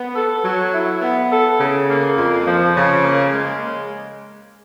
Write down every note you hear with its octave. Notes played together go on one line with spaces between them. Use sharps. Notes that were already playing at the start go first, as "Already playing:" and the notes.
Already playing: B3
A4
F#3
E4
B3
A4
C#3
A#3
F2
F3
C#3
A#3
G#3